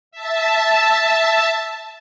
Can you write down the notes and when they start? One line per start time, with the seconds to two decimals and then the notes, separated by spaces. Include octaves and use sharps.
0.11 E5 A5